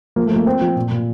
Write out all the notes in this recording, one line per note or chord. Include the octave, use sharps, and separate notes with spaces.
F3 A#3
A3
F3 A#3
F3 C4
F3
A#2
A#2